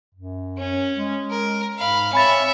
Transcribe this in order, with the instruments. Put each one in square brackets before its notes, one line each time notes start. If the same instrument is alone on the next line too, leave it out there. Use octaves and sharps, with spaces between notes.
[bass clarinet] F#2
[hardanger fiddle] C#4
[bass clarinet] G#3
[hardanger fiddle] A#4
[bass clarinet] G#2 [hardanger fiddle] F5 B5
[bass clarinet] C4 [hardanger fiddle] C#5 E5 [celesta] G#5 B5 A6